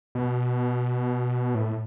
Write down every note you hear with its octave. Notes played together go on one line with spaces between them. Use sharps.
B2
A2